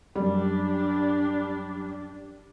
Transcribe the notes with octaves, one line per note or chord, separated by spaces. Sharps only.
F#2 G3 D4 G4